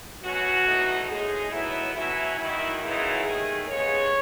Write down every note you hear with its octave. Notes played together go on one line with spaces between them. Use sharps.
B2 F#3 C#4 F#4
E2 B2 A3 D#4
A2 G#3 D#4 G#4
A2 F#3 B3 D#4 E4
B2 F#3 C#4 E4
F#2 D#3 F#3 E4
F#2 C#3 G#3 B3 D#4 E4
D#2 D#3 A3 G#4
D#2 C#3 G#3 B3 C#5